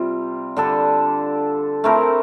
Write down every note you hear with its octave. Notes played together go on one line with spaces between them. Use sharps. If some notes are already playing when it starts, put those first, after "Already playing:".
Already playing: C3 G3 F4
D3 G3 D4 A4
A3 C4 E4 A#4